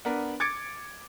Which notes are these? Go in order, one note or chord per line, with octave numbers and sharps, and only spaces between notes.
B3 D4 A#4
D6 G#6 A6 C#7 D7